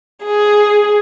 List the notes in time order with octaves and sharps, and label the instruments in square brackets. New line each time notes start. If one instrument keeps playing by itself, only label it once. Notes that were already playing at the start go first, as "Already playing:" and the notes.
[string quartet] G#4